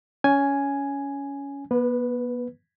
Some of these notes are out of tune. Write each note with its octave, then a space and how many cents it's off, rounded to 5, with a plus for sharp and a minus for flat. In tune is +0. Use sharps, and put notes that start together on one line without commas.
C#4 +20 G#5 +0
B3 -40 B4 +0